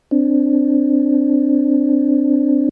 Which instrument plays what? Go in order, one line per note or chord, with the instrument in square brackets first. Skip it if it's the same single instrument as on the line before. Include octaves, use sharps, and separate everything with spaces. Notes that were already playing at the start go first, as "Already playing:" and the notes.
[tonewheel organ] C4 D4